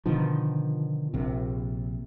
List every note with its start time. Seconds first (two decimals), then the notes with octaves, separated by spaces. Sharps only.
0.06 B2 D3 D#3 F3
1.14 A#1 C3